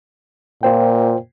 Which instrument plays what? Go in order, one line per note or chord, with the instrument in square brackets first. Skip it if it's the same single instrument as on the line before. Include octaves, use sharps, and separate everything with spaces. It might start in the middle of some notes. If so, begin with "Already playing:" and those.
[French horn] A#2 [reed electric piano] F4 C5 G5